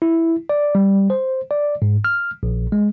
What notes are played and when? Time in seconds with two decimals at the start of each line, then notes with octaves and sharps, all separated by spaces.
0.02 E4
0.49 D5
0.75 G3
1.10 C5
1.51 D5
1.82 G#2
2.05 F6
2.43 A#1
2.72 G#3